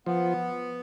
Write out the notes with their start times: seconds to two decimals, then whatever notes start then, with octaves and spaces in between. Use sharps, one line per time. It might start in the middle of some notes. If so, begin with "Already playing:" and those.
0.06 F3 B3